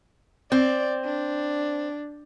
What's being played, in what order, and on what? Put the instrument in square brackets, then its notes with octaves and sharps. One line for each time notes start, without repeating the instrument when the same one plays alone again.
[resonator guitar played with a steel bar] C4 [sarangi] D5
[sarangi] D4